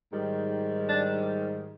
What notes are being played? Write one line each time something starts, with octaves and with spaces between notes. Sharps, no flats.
G#2 D#3 G3
D4